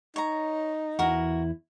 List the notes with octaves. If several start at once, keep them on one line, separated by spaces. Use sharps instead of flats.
D#4 C#5 A#5
E2 E4 F#4 A#4